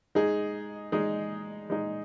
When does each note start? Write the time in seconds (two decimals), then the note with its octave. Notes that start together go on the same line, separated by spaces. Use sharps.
0.15 G#3 D#4 G#4
0.92 G#3 D#4 G#4
1.70 G#3 D#4 G#4